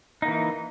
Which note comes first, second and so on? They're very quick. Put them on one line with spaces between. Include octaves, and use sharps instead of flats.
D#4 A#3 E3